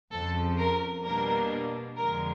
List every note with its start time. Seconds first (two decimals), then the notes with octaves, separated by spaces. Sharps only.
0.12 F2 C#3 F3 A4
0.58 A#4
1.04 B2 G3 A#3 D4 A#4
1.97 F2 D3 F3 G#3 A#4